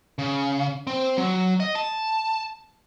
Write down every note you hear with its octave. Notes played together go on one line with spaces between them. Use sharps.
C#3
C4
F#3
D#5
A5